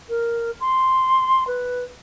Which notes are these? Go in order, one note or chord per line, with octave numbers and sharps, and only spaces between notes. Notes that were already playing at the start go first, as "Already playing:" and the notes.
A#4
C6
B4